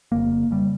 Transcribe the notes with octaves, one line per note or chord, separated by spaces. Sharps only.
F1 F2 C#3 A#3
C#3 G3